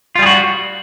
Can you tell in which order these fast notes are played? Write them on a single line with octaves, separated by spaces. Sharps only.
F4 G3 G#4 F#4